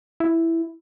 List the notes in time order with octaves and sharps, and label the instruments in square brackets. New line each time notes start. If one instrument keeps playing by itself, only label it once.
[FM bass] E4